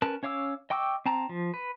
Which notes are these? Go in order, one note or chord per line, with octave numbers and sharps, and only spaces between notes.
C#4 A#4 B4 A5
C#4 C#5 F5 D6 E6
D#5 G5 C#6 D6 E6
C4 A5 A#5
F3
B4